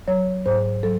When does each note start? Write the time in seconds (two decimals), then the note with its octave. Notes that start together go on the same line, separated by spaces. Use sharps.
0.08 F#3 C#5
0.46 G#2 C5
0.83 F#3 A4